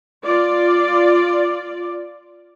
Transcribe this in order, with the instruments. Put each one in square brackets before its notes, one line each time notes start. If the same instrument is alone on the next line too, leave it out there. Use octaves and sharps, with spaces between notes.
[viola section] F4 D5